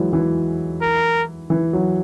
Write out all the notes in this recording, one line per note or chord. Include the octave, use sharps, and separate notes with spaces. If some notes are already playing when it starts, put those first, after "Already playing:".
Already playing: E3 F#3 G#3
E3
A#4
E3
F#3